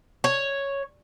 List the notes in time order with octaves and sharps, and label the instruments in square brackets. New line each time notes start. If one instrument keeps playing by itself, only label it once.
[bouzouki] C#5